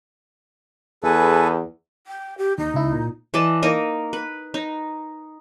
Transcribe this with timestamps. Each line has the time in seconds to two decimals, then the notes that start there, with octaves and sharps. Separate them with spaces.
1.03 E2 G#4 A4 B4
2.07 G5
2.38 G4
2.58 D#2 D#4
2.74 C#2 E4
2.93 A#2
3.34 E3 D5 D#5 A5
3.63 A#3 D#4 D#5
4.13 B4
4.54 D#4